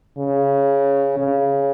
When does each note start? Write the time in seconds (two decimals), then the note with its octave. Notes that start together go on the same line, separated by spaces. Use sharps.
0.18 C#3
1.19 C#3